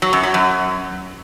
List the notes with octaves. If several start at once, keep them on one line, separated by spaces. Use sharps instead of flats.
F#3
F#2
F#3
F#2